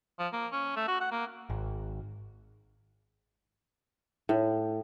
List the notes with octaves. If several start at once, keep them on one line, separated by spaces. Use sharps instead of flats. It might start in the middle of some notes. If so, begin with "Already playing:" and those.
F3
A#3
C#4
A3
F#4
F#5
A#3
G#1
A2